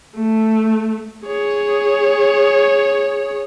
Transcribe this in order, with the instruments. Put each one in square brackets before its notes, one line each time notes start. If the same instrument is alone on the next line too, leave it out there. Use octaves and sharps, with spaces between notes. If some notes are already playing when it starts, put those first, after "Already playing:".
[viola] A3
[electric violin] G#4 C#5